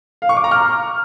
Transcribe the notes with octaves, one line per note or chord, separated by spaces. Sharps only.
F5
C#6
D6
A#5
F6